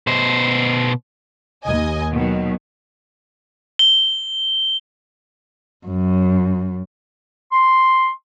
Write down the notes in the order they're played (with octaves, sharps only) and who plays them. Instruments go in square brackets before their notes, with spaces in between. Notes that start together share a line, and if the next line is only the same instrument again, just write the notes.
[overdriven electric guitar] B2 C5
[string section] D#2 D#5 G#5
B2 D#3 F#3
[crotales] G7
[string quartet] F#2
[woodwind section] C6